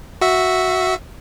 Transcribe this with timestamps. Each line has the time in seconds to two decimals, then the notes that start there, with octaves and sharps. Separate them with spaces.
0.21 F#4 E5